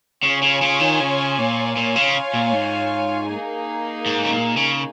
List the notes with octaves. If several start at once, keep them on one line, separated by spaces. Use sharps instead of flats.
C#3 F4 C#5 G#5
C#3
C#3
D#3
C#3
A#2
A#2 F4 C#5 F5 G#5
C#3
A#2
G#2
A#3 D#4 G#4
G#2
C#3
A#2
C#3